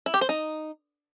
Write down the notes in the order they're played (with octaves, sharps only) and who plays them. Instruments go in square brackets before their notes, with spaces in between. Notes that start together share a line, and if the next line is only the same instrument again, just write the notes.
[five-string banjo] E4
G4
C5
D#4